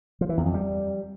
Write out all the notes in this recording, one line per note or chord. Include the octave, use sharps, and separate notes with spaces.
F3
E3
E2
F2
G3